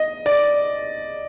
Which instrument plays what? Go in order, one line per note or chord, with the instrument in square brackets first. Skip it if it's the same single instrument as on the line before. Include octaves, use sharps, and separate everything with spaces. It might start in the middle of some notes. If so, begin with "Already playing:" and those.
Already playing: [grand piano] D#5
D5